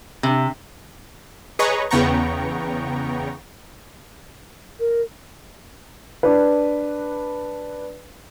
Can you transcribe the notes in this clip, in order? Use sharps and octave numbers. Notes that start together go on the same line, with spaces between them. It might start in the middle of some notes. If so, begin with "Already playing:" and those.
C3
G#4 B4 C#5 D#5 A#5 C#6
E2 C#3 B3 G5 A#5 C#6
A#4
D4 B4